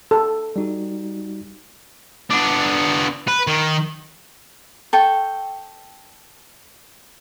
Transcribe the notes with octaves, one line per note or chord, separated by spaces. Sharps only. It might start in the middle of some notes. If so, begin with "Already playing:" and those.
A4
G3 D#4 F#4
B3 D4
B4
D#3
A4 G5 C#6